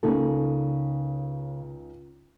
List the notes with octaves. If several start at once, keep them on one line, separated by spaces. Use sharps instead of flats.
C#2 C#3 A#3 C#4 D#4 A4